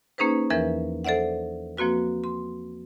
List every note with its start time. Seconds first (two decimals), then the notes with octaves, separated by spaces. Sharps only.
0.18 A#3 C#4 D#4 G#4 B4 C5
0.50 E2 E3 F3 A#4 B4 E5
1.04 A4 C5 D5 E5 F#5
1.77 F3 A#3 C4 F#4 B4
2.24 C6